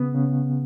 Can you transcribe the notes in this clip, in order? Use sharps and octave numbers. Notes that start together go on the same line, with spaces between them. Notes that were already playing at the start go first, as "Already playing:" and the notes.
Already playing: C#3 B3
C#3